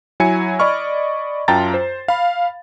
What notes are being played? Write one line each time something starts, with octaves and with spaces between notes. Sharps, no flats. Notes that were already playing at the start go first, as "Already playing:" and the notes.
F#3 E4 G#5 G#6 C#7
D5 D#5 B5 C#6 F6
F#2 F4 G5 A5 A#5 A6
C5
F5 B5